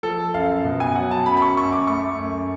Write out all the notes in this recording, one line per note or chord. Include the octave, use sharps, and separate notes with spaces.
F3 A4
F#2 F5
B2
G#5
F#3 F#5
A5
F#2 B5
B5
C#6
F#2 C#6
D6
A3 C#6
F#2